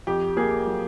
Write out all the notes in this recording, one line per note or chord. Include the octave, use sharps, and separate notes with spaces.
F2 G4
A#3 G#4
F#3